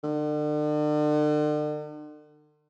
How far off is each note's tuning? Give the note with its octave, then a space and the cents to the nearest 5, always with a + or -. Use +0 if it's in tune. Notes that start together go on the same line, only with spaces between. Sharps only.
D3 +40